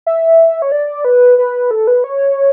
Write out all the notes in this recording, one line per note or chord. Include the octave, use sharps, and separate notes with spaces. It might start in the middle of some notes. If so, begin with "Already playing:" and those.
E5
C#5
D5
B4
B4
A4
B4
C#5